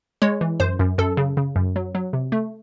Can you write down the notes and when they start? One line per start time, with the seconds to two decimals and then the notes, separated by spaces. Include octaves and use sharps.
0.22 G#3 C#5
0.41 E3
0.60 F#2 C5
0.79 F#2
0.98 F#2 A4
1.17 C#3
1.37 C#3
1.56 F#2
1.76 F#3
1.95 F#3
2.13 C3
2.32 A3